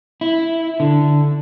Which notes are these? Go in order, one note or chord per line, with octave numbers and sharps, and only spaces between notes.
E4
D3